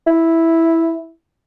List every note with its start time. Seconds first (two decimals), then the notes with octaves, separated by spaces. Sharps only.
0.07 E4